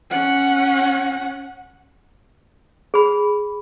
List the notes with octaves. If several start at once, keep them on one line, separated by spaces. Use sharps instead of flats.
C#4 F#5
G#4 B5